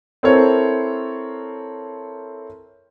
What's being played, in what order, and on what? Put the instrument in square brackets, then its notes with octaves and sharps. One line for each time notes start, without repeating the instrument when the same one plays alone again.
[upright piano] C4 E4 A4 A#4 C5 C#5